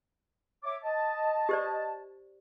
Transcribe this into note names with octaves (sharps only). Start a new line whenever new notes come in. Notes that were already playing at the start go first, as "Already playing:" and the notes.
C#5 E5 D6
D#5 A5
G4 C5 D5